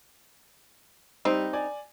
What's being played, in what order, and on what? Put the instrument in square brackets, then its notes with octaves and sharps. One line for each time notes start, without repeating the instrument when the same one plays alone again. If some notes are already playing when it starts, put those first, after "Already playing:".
[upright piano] G3 [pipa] C4 D#4
[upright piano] D5 G#5